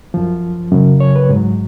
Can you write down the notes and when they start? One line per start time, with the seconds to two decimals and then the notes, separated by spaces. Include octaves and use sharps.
0.14 F#2 F3
0.72 F#2 C#3 F#3
1.00 C#5
1.16 B4
1.29 G#2
1.35 F#3